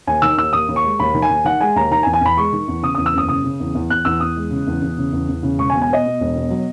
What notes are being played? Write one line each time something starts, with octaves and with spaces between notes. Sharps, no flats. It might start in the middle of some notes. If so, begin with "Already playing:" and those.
D#2 G#5
D#3 E6
D#2 E6
D#2 D#6
D#2
C#6
G#3
D#2 B5
D#3
G#5
D#2
D#3 F#5
G#3 G#5
D#2 A#5
D#3 A#5
G#5
E2
G#5
E2 B5
G#3 C#6
D#3
E2
C#3 D#6
E2 D#6
E6
F#1 D#6
C#3 D#6
C#3
E2
E2
E2 F#6
E2 E6
E2 D#6
G#3
C#3
E2
E2
C#3
E2
E2
C#3
E1 C#6
G#5
B2
G#5
B2 D#5
B2
E1
B2
F#3